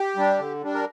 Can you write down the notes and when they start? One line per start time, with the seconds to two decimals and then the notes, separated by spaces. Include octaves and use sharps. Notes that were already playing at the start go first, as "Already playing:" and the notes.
Already playing: G4
0.16 G3 D4
0.39 D3
0.62 G3 D4
0.74 A#4